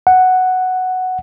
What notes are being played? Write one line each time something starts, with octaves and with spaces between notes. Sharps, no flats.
F#5